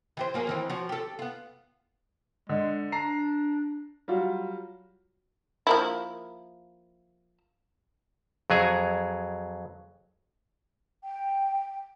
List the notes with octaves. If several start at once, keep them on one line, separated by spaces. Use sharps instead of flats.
E3 G4 C5
F#3 A#3 G#4
D#3 E3 C4
F3 F#4 C#5
G4 A4
B3 F4
D3 G#3
D4 A5 A#5 C7
F#3 G3 F4 F#4
F3 A#3 E4
F2 F#3 G#4 G#5
G5